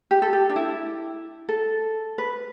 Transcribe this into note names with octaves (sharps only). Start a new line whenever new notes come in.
G4
A4
G4
D4
E4
A4
B4